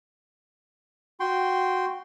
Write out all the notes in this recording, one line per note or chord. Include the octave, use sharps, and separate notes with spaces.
F#4 G5 C6